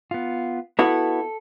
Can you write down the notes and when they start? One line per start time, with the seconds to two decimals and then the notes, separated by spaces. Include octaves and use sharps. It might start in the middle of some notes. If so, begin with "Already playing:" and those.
0.11 B3 F4
0.79 B3 E4 F#4 A4